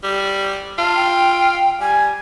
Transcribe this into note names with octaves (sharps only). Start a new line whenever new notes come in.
G3
F4 A5
G5
G3 G#5